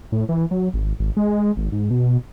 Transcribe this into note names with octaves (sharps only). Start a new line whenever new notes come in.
A2
E3
F#3
G#1
G#1
G#3
G#1
G#2
B2